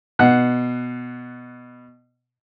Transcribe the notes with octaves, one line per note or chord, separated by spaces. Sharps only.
B2 F#5 F#6